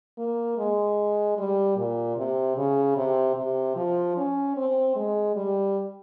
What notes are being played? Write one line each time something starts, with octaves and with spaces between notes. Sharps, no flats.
A#3
G#3
G3
A#2
C3
C#3
C3
C3
F3
C#4
C4
G#3
G3